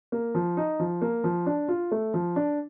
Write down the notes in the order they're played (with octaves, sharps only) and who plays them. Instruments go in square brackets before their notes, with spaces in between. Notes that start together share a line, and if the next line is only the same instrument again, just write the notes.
[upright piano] A#3
F3
D#4
F3
A#3
F3
D4
F4
A3
F3
D4